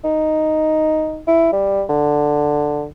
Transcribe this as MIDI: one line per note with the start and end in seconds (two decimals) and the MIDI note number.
0.04 1.20 63
1.27 1.48 64
1.52 1.83 55
1.89 2.85 50